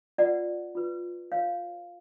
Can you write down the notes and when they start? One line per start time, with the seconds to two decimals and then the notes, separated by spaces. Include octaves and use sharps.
0.18 F4 B4 D5 F#5
0.75 F4 B4
1.31 F4 B4 C#5 F5